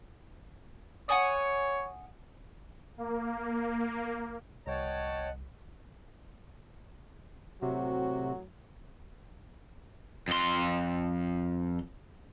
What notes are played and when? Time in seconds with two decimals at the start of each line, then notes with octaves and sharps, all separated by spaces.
1.09 C#5 F#5 G#5 D#6
2.98 A#3
4.67 C2 C#5 D#5 F#5 G5 A5
7.62 A2 C3 F#3 F#4
10.28 F2 C6